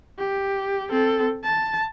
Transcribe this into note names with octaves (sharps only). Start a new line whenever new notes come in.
G4
C4 A4
A5